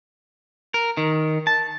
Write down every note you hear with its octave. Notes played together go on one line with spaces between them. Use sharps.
A#4
D#3
A5